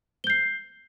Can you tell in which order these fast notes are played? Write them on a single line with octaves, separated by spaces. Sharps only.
G7 G6 C7